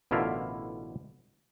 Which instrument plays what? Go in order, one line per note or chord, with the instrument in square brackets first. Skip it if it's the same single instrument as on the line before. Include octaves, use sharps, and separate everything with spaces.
[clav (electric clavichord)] A1 B2 D3 E4 F4 A#4